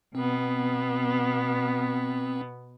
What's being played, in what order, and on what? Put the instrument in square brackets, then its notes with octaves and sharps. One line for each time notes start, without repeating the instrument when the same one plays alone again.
[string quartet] B2 B3 [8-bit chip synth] C4